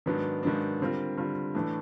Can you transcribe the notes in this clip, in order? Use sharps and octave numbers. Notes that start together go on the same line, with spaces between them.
G#2 D#3 F#3 B3 D4
G#2 D#3 F#3 B3 D4
D3 G3 C4 F4 A#4
D3 G3 C4 F4 A#4
A2 E3 A3 D4